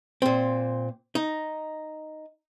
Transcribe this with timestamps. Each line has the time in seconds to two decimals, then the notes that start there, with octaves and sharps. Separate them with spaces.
0.22 A#2 C4
1.15 D#4